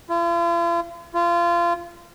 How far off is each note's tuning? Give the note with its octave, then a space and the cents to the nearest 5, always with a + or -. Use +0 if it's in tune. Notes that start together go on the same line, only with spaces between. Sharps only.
F4 -45
F4 -25